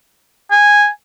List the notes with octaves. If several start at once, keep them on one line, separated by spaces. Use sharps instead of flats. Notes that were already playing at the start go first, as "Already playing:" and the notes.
G#5